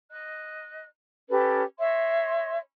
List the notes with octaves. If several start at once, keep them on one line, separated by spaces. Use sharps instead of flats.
D#5 F#6
C#4 G4 A4 B4
C#5 D#5 E5 C6